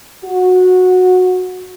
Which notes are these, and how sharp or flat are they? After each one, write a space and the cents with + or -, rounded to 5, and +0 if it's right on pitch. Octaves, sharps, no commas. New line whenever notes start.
F#4 -15